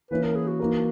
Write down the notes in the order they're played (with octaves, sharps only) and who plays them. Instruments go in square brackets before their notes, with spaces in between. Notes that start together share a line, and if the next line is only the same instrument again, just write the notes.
[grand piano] E3 A#3 C#4 E4 [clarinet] B4
[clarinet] A#4
G#4
F#4
[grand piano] E3 A#3 D#4 A#4